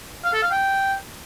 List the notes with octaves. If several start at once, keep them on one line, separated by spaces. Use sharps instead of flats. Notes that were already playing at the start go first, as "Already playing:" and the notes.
F5
A4
F5
G5